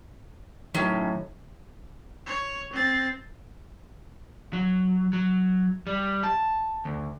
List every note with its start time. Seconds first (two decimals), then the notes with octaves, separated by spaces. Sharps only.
0.75 A2 D#3 F#3 C#4 D#4
2.27 C#5
2.73 C4 A6
4.53 F#3
5.13 F#3
5.87 G3
6.24 A5
6.85 D2